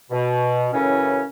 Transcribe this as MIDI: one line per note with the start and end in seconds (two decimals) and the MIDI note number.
0.11 0.68 47
0.74 1.23 42
0.74 1.23 45
0.74 1.23 49
0.74 1.23 52
0.74 1.23 61